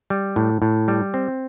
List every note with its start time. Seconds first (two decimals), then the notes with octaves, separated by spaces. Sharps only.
0.10 G3
0.36 A2
0.62 A2
0.88 G3
1.14 C4